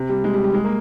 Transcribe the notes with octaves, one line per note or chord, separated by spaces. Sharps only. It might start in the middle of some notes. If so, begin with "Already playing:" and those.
Already playing: C3
G3
G#3
G3
G3
G#3
A#3